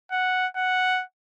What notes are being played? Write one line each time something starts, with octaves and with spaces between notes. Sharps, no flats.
F#5
F#5